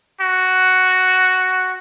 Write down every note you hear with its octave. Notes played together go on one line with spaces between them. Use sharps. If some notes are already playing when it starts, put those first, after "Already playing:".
F#4